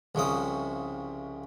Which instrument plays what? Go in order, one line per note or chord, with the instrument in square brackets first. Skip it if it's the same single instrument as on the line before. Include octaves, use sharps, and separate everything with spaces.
[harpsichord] C2 C#3 F3 D#6